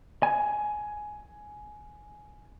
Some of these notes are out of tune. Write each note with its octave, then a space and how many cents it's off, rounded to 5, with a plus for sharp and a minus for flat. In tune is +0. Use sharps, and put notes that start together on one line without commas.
G#5 +15